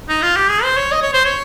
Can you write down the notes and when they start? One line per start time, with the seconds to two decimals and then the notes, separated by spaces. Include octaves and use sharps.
0.09 D#4
0.22 F4
0.36 G4
0.50 G#4
0.63 C5
0.77 C#5
0.91 D#5
1.02 C#5
1.13 C5
1.24 C#5